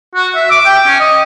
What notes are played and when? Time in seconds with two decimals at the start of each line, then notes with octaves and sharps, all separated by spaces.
0.15 F#4
0.35 E5
0.51 D6
0.66 G5
0.87 C#4
1.00 D#5